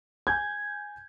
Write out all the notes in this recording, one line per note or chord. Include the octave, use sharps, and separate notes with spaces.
G#5 G6 G#6